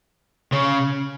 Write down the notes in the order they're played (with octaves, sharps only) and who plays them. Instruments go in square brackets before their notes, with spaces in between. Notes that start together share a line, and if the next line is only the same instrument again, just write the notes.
[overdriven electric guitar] C#3